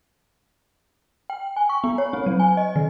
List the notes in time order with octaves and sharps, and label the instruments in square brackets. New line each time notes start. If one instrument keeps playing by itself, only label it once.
[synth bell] G5
G#5
C#6
B3
C#5
C4
F#3
G#5
D#5
D#3